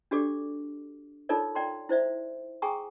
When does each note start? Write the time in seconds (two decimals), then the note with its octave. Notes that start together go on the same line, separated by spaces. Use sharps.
0.11 D4 F#4 G4 A4 D5 D6
1.29 D#4 F4 A4 A#4 C#5 D5
1.55 D5 G5 A#5 C6
1.89 E4 C5 D5 E5
2.62 G#4 G5 G#5 A#5 C#6 D#6